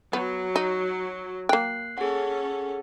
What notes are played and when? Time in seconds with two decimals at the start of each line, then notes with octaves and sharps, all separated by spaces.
0.13 F#3 B3
0.56 D#4
1.49 A#3 G5 F#6 C7
1.98 C#4 G#4 A4 F#5